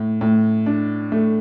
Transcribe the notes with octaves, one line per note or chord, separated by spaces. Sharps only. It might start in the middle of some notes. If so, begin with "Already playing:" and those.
Already playing: A2
A2
D4
A3